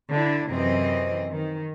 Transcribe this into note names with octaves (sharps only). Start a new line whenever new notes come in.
D3 D4 E4
F#2 C3 E3 C4 D#5
D#3